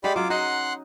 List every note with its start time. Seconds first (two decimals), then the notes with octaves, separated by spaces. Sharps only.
0.04 G#3 G4 D5 F5 F#5 B5
0.16 F#3 C#4 F4 D6
0.30 D#4 F#4 D#5 F#5 C6 F#6